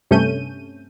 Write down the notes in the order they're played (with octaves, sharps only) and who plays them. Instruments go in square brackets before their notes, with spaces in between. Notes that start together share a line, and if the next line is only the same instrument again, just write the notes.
[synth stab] G2 C3 A3 C#4 G6 D#7